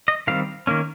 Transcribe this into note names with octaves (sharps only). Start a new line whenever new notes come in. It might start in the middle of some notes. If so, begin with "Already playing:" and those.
D#5
D#3 G3 C4 F5
D#3 A#3 C#4